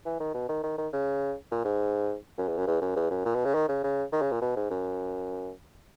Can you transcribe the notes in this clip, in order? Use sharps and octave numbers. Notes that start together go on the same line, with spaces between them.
E3
D#3
B2
D#3
D#3
D#3
C#3
A#2
G#2
F#2
E2
F#2
E2
F#2
E2
F#2
A#2
B2
C#3
D#3
C#3
C#3
D#3
C#3
A#2
B2
G#2
F#2